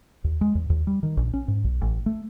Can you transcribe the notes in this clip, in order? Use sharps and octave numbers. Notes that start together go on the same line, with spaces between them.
D#2
G#3
E2
D#2
G3
D#3
A#1
C#4
G#2
B1
A1
A3